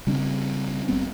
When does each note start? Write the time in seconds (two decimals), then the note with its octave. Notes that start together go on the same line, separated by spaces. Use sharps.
0.07 C#3 G3 C4 D4
0.88 F#1 G3 B3 C4